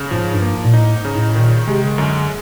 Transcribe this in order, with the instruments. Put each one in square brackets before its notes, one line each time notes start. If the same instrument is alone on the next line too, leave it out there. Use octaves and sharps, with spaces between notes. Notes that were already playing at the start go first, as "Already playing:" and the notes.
Already playing: [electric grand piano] C#3
[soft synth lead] G#2 [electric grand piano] F3
[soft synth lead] G2
[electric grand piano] A#3
[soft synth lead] G#2
A#2
[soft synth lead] A2 [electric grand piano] D#4
[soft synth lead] G#2
[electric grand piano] C#3
[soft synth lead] A2
[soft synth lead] A#2 [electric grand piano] D#3
[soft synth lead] C3 [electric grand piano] G#3
[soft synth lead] C#3
[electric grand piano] F#2 [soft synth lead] D3